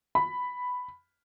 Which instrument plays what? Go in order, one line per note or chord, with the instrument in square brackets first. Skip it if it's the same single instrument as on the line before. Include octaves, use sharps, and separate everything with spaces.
[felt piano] B5